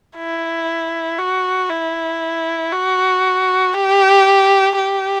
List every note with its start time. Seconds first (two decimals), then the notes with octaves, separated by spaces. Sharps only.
0.17 E4
1.19 F#4
1.69 E4
2.72 F#4
3.74 G4
4.75 G4